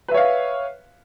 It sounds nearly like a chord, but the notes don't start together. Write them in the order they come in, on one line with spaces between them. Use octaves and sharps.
B4 E5 C#5 F5